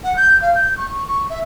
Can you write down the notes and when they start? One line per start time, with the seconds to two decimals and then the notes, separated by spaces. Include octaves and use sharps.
0.04 F#5
0.16 G6
0.42 F5
0.55 G6
0.77 C#6
1.07 C#6
1.30 E5